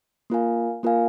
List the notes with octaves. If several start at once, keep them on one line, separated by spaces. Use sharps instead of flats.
A#3 F4 A#4 F5 G#5
A#3 F4 A#4 F5 G#5